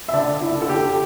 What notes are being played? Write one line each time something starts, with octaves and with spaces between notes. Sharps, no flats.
E5
D3 D5
E4
D3
A4
G4